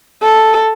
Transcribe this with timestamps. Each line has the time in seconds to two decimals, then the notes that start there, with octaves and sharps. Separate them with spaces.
0.23 A4